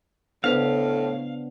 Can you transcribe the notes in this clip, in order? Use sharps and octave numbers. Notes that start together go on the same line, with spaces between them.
A2 C#3 B3 D4 B4 C5 F5